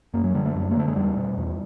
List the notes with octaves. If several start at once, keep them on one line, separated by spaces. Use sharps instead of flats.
F#2 A#3
F#3
D3 G3
A3
F#2
A#3
D3 A3
G#3
E2 G3
B2
E2